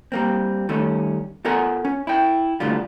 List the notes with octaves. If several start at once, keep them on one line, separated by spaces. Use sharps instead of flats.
G3 A#3 C4
D#3 G3 A3 C#4
B3 F4 A4 A#4 F#5 G#5
C#4
E4 G5
D2 A2 D3 G3 F4